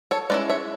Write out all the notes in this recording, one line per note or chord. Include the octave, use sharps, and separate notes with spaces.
A4 C#5
G#3 C#4 E4 B4 D5
C#5 E5